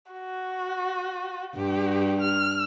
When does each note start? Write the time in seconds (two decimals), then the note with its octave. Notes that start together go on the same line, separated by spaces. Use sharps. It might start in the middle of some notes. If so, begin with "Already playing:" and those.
0.11 F#4
1.56 G2 G4
2.21 F6